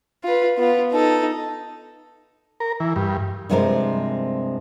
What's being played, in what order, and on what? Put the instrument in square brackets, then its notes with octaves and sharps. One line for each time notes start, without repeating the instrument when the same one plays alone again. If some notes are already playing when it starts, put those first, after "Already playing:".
[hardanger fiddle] F4 B4
B3 F4
D#4 A4
[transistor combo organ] A#4
E3
G2
[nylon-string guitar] G2 C3 F3 G#3 A#4 C5